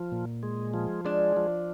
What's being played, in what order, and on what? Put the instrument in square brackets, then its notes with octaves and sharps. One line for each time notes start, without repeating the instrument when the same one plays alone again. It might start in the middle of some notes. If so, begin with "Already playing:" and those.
Already playing: [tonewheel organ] F3
A#2
G#3
F3
[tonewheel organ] G#3 [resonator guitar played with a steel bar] D4
[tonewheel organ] F3